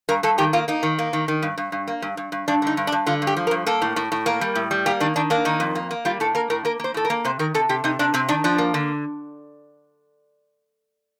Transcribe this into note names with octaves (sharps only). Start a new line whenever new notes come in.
G2 A#4
G2 A4
D#3 G4
A#3 F4
A#3 D#4
D#3
A#3
D#3
D#3
G2
G2
G2
A#3
G2
G2
G2
G2 D4
D3 D#4
G2
D4
G2
D3 F4
G2
G4
F3
A#4
G2
A#3 A4
A2
A2
A2
A#3 A#4
G3
A2
G3
A#3 G4
D#3 D4
D#3 D4
A#3 D4
D#3 D#4
F2
A#3
A#3
G3 F4
A2 A4
A#3 A#4
A2 A#4
A#3 A#4
A#3 C5
A2 A4
A#4
A#3
C3 C5
D#3 A#4
C3 A4
C3 G4
C3 D#4
C3 D4
C3 C4
D#3 D4
F3 D4
A#3
D3